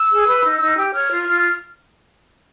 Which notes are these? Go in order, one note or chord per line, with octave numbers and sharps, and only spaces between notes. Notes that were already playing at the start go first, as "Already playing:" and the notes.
Already playing: E6
G#4
B4
D#4
D#4
G4
C#5 F6
F4
F4